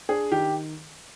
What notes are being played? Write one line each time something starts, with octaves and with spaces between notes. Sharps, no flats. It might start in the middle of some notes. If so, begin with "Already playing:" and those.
D4 G#4
D#3 G4